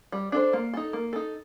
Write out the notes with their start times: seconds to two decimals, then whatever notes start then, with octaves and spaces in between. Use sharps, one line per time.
0.12 G3
0.32 D4 A4 C5
0.53 A#3
0.74 D#4 A4
0.93 A#3
1.13 D#4 A4